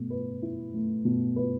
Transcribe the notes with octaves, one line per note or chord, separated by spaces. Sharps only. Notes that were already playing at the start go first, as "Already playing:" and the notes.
Already playing: B2 A3
B4
E4
A3
B2
B4